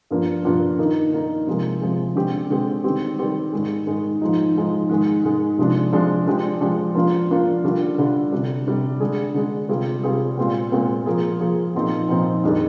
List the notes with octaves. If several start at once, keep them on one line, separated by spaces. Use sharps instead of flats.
G2 F3 A#3 D4 F4
G2 F3 A#3 D4 F4
D#3 A#3 D#4
D#3 A#3 D#4
C3 F3 G#3
C3 F3 G#3
D3 G#3 C4 G4
D3 G#3 C4 G4
D#3 G3 C4 G4
D#3 G3 C4 G4
G#2 D#3 G#3
G#2 D#3 G#3
G#2 F3 G#3 D#4
G#2 F3 G#3 D#4
G#2 D#3 G#3
G#2 D#3 G#3
C3 F3 G#3 D4
C3 F3 G#3 D4
F3 G#3 D4 G4
F3 G#3 D4 G4
F3 A#3 D4 F4
F3 A#3 D4 F4
D3 G3 D4 F4
D3 G3 D4 F4
C3 G3 D4
C3 G3 D4
D3 G#3 D4 G#4
D3 G#3 D4 G#4
C3 G3 C4 F4 G#4
C3 G3 C4 F4 G#4
A#2 G#3 C4 F4
A#2 G#3 C4 F4
F3 A#3 F4 G#4
F3 A#3 F4 G#4
A#2 F3 C4 D#4
A#2 F3 C4 D#4
F2 D#3 G3 D4 G#4